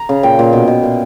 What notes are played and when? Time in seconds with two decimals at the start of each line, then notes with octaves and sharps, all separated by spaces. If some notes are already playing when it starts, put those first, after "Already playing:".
Already playing: A#5
0.09 C#3
0.23 A#2 G5
0.39 A#2
0.53 B2
0.68 B2
0.83 A#2